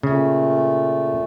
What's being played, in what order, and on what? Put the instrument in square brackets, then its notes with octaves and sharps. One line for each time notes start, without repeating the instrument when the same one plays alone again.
[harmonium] A#2 A3 [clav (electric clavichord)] C#3